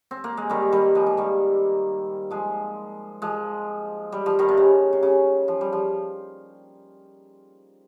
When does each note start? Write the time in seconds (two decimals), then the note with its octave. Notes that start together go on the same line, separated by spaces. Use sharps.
0.11 C4
0.24 A#3
0.37 G#3
0.50 D#3 G3
0.72 D#3 G3
0.95 F3 G#3
1.07 F3
1.17 D#3 G3
2.31 F3 G#3
3.22 F3 G#3
4.12 G3
4.26 F3
4.39 D#3 G3
4.49 C3
4.57 C#3
4.93 C3
5.03 C#3
5.48 F3
5.61 G3
5.73 F3